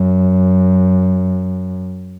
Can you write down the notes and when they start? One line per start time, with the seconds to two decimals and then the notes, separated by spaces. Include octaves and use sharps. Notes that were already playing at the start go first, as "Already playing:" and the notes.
Already playing: F#2